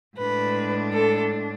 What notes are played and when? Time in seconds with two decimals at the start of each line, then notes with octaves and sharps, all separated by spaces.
0.17 A2 G#3 D4 B4
0.93 A4